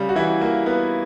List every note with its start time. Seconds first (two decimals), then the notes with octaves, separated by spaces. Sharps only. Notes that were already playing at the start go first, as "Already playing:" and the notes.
Already playing: C#3 G3
0.09 F#4
0.16 E3 E4
0.41 A#3
0.66 B3